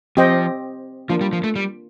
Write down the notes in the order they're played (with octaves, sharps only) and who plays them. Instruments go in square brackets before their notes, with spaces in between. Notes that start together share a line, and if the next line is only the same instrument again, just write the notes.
[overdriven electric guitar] F3 [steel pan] C4 G4 C5 D#5 G5
[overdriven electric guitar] F3 [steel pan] A#3 D4 F4
[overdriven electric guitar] G3
F3
A3
G3